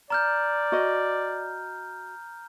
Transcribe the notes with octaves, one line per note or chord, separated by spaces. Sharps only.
D5 A#5 F6 G6
F#4 D#5